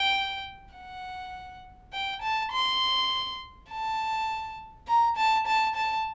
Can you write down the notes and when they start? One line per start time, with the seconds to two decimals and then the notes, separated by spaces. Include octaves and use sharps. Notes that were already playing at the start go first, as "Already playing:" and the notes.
Already playing: G5
0.75 F#5
1.93 G5
2.22 A5
2.52 C6
3.70 A5
4.88 A#5
5.17 A5
5.47 A5
5.76 A5